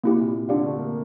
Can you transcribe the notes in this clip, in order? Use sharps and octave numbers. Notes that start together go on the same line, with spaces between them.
C3 A#3 E4 G4
A#2
A#2
D3 D4 G4 D5 F5
A3
A#3